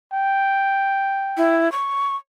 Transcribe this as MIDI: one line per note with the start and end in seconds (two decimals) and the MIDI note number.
0.13 1.64 79
1.37 1.71 64
1.72 2.16 85